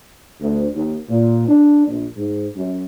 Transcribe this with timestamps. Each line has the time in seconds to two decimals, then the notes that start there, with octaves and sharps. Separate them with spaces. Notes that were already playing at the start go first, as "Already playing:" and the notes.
0.40 D2
0.74 D#2
1.09 A#2
1.48 D4
1.86 A#1
2.16 G#2
2.54 F#2